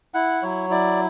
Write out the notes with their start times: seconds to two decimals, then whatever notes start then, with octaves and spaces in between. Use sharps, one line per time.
0.14 E4 F#5
0.42 F#3 C#5
0.70 E4 D5